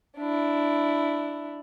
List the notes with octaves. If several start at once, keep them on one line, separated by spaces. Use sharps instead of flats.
D4 E4